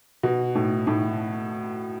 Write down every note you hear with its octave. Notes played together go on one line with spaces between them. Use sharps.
B2
A2
A2